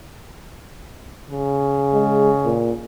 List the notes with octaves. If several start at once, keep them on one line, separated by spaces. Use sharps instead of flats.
C#3
G#3
A#2